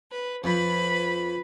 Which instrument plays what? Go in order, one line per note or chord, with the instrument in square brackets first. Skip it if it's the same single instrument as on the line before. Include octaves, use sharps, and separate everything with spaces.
[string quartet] B4
[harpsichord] F2 [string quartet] B4 B5